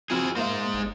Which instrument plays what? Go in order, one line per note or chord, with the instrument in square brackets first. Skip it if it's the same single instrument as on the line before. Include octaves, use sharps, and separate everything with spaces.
[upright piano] F3 F#4 F6 [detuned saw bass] C4 [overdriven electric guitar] E4 G#4
[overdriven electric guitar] G#3 C5 [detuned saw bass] A#3 [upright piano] E5 F5
[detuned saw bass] G1